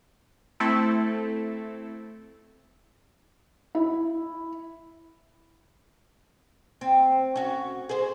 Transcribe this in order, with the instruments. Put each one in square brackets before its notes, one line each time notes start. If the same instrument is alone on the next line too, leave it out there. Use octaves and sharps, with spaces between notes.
[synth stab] A3 C4 E4 A4
[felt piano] E4
[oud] C4
C#4 F#4
G#4 C5